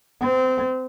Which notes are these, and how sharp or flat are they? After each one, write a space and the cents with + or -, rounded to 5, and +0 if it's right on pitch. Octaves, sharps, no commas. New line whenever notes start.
C4 -25